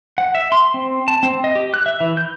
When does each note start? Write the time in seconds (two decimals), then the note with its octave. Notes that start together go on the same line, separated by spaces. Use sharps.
0.18 F#5
0.35 E5
0.52 C6
0.74 C4
1.08 A5
1.23 C4
1.44 D#5
1.55 G4
1.74 F#6
1.86 E5
2.00 E3
2.17 G6